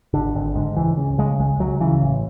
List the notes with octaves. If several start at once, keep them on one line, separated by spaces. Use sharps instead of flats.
G#1 D3
G#1
G#2
C#2 E3
C#3
C#3 G#3
C#2 G#3
C#2 F#3
C#3 E3
A1